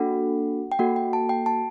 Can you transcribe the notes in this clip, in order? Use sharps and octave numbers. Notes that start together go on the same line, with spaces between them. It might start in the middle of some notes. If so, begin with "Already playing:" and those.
Already playing: A#3 D4 F#4 A4 F#5
G5
A#3 F#4 A4 F#5
G5
A5
G5
A5